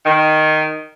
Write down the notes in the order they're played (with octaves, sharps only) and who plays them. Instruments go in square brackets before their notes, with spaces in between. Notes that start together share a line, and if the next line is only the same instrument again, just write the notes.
[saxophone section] D#3